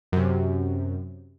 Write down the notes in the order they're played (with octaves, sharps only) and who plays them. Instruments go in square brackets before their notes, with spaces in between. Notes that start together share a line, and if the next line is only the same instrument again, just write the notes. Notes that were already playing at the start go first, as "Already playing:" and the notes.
[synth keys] F#2 C3